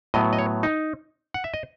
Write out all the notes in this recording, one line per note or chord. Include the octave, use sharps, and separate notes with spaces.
A2 F#3 B3 D#5
D#5
C#5
D#4
F#5
E5
D#5